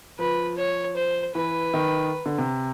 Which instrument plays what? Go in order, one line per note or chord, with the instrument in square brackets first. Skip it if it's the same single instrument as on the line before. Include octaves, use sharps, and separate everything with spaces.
[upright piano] F3 [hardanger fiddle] B4
[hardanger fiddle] C#5
C5
[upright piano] E3 [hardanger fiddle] B4
[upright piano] D#3
D3
C3